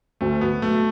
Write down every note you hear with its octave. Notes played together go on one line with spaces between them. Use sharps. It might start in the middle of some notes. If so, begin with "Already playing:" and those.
D2 A3
D2 B3
B1 A3